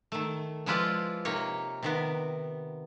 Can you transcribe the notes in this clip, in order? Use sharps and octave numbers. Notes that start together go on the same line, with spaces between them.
D#3 A3
F3 G#3 E4 F4 B4 D5
C3 A#3 D#4 C#5
C3 D#3 B3